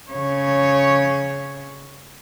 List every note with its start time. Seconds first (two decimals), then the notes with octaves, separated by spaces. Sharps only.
0.11 C#3 C#5